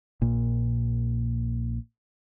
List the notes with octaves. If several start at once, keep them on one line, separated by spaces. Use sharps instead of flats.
A#1 A#2